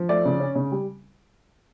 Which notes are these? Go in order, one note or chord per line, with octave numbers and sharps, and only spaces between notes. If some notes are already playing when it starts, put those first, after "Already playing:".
Already playing: F3
A3 D5
C#3
C#4
C#3
G3